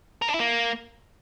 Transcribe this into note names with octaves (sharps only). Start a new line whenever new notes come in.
A#4
D4
E4
A#3